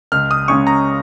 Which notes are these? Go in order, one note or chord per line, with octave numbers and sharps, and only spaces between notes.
C#2 F6
D#6
C#3 G#3 C#4 C#6
A#5